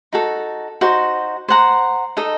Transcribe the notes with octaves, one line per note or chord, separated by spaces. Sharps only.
D#4 F#4 A4
D#4 F#4 C5
C5 F#5 A#5
D#4 A4 D#5